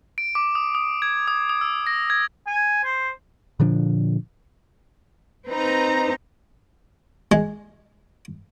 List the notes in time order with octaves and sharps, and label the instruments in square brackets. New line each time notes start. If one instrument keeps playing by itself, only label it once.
[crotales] D7
D6
D#6
D#6
G#6
D#6
D#6
E6
A#6
G#6
[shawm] G#5
C5
[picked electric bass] A#2 D3 F3 D4
[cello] C4 D#4 [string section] B4 A#5
[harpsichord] G#3